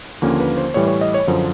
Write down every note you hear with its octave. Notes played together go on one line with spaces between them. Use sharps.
D#2 D3 F3 A#3 C#4
B4
C5
A2 E3 G3 C#5
C#5
D#5
C#5
F#2 D3 F3 C5